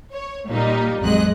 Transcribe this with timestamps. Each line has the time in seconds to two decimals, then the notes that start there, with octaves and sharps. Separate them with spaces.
0.13 C#5
0.50 A#2 G3 A#3 D#4
1.01 A1 F2 F#3 G#3 D#5 F#6